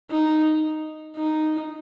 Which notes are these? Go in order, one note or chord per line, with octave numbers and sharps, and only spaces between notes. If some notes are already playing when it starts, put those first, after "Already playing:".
D#4
D#4